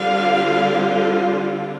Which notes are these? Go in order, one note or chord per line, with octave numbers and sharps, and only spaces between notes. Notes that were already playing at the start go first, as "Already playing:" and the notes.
Already playing: D3 G3 C4 F4 F5